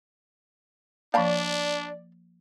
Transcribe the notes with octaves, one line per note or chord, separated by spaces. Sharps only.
F3 A#3 D4 D5 F5 A5 B5